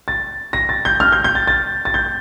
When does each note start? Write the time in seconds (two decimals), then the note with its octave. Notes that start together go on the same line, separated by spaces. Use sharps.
0.08 A6
0.53 A#6
0.69 A6
0.85 G6
1.00 F6
1.12 G6
1.24 G6
1.35 A6
1.47 A6
1.85 A6
1.94 G6